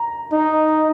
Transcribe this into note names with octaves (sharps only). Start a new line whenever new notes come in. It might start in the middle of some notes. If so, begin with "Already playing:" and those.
Already playing: A#5
D#4